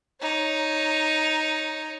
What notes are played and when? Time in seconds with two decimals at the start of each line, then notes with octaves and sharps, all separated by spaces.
0.21 D#4 C#5